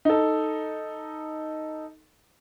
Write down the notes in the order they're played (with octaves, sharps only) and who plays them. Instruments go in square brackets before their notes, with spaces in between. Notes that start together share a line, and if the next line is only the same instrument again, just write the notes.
[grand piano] D#4 A4